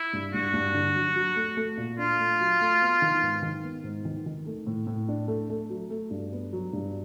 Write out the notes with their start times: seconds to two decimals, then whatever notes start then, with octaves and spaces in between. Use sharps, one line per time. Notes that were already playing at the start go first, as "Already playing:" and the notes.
Already playing: E4
0.13 G2
0.33 G2 F#4
0.54 G2
0.74 D3
0.96 F#3
1.16 F#3
1.36 A3
1.57 A3
1.77 A#2
1.98 D4 F4
2.19 A3
2.40 F#3
2.61 A3
2.82 B3
3.02 D#3
3.23 G#2
3.42 D#3
3.64 B3
3.84 G#2
4.05 D#3
4.26 D#3
4.46 A3
4.67 A2
4.87 A2
5.09 D4
5.28 A3
5.50 A3
5.70 F#3
5.90 A3
6.11 G2
6.32 B3
6.53 F#3
6.73 G2